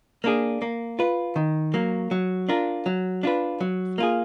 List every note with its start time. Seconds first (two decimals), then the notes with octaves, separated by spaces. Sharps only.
0.24 A#3 D4 G#4
0.62 A#3
0.99 F4 B4
1.36 D#3
1.74 F#3 A#3
2.11 F#3
2.49 D4 F4 A#4
2.86 F#3
3.23 D4 F4 B4
3.61 F#3
3.98 A#3 F4 G#4